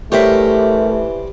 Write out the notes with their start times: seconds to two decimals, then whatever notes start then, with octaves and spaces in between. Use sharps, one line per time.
0.12 E3 G3 A3 G4 A#4 C5 C#5 E5